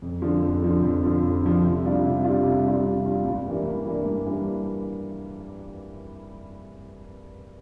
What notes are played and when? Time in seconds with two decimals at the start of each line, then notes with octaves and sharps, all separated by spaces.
0.02 F2
0.22 D3 F3
0.42 F2
0.62 D3 F3
0.83 F2
1.03 D3 F3
1.23 F2
1.43 D3 F3
1.64 C3
1.84 G3 D4 F4
2.04 C3
2.24 G3 D4 F4
2.44 C3
2.65 G3 D4 F4
2.85 C3
3.05 G3 D4 F4
3.25 G2
3.46 E3 G3 A#3 D4
3.65 G2
3.86 E3 G3 A#3 D4
4.06 G2
4.26 E3 G3 A#3 D4